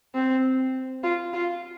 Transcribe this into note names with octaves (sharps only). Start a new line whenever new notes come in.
C4
F4
F4